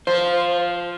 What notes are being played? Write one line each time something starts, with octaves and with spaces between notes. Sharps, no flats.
F3 C5